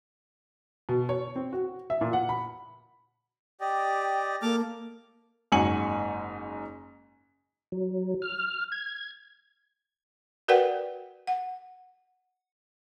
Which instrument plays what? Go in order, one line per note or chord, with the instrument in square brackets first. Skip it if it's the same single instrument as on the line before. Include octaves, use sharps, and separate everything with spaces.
[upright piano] B2
C#5
C4
F#4
E5
A#2
F#5
B5
[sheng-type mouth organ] G4 D5 D#5 [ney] G5
[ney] A#3 [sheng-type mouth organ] A4 D6 F6
[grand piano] F#1 G#2 F#4 G#5 C#7 F#7
[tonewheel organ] F#3
F6
G#6
[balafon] F#4 A#4 B4 D5 F#5 G5
F#5